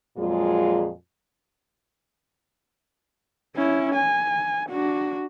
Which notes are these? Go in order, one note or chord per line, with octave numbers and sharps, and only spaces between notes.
F2 A#2 F#3 G#3 F4 G#4
C#4 E4
G#5
D4 F#4